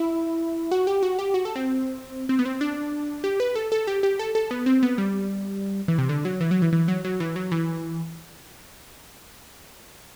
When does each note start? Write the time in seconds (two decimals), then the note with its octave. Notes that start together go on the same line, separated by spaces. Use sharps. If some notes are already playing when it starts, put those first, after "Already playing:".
Already playing: E4
0.72 F#4
0.87 G4
1.03 F#4
1.19 G4
1.34 F#4
1.45 A4
1.56 C4
2.29 C4
2.39 B3
2.45 C4
2.61 D4
3.24 G4
3.40 B4
3.55 A4
3.72 A4
3.87 G4
4.03 G4
4.19 A4
4.35 A4
4.51 B3
4.66 C4
4.83 B3
4.98 G3
5.88 E3
5.98 C3
6.09 D3
6.25 F#3
6.41 E3
6.51 F#3
6.62 E3
6.73 E3
6.88 F#3
7.04 F#3
7.20 E3
7.36 F#3
7.51 E3